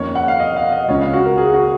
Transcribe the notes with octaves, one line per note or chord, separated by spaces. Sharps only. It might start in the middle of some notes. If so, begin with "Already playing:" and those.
Already playing: F2 D#3 A#3 C#4 C#5
F#5
F5
D#5
F5
D#5
C#2 C#3 G#3 C#4 F4 C#5
F5
F#4
A#4
G#4
F#4